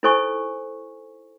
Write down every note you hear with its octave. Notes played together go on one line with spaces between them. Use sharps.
D#4 E4 A4 C5 G#5 C#6